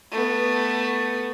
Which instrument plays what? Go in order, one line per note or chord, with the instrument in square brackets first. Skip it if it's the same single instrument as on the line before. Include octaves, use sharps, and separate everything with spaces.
[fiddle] A3 B3